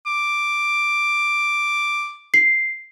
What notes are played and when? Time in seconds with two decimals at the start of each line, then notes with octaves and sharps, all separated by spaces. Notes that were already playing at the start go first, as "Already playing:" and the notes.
0.06 D6
2.34 C7